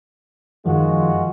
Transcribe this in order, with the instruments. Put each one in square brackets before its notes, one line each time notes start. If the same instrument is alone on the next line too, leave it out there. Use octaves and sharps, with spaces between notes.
[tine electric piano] F#2 D#3 F3 [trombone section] G#3 F4 F#4